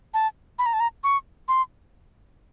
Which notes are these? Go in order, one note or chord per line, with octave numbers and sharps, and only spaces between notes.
A5
B5
A#5
A5
A#5
C#6
C6